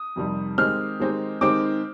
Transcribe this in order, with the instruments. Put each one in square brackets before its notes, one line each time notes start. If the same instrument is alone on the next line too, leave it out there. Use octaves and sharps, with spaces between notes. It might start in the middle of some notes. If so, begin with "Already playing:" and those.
Already playing: [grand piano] D#6
[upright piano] F2 C3 D#3 G3
[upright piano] D#3 G#3 C4 D#4 G4 [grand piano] F6
[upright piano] D#3 G#3 C4 D#4 G4
[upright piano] D#3 G#3 C4 D#4 G4 [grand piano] D6